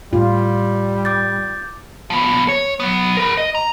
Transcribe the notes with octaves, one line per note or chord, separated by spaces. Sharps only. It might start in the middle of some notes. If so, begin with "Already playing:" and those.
A2 G3 F4
D6 G6 A6
F3 B3
C#5
F#3 B3
A#4 B4
D#5
A#5